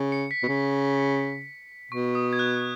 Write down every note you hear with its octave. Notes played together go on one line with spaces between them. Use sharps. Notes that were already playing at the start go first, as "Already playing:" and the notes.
Already playing: C#3
C#7
B6
B2
C#3
B2 C#6
D#6
G#6
F#6